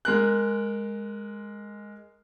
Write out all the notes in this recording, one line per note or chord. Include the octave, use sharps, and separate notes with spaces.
G#3 A#4 F#6